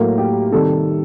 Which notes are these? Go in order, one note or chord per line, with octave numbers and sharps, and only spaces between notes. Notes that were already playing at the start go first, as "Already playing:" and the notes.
Already playing: A2 F#3 A#3 A#4
G4
C3 D#3 G3 A4